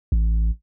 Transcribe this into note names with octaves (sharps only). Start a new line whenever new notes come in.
A1